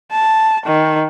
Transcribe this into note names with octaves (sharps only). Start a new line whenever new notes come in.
A5
D#3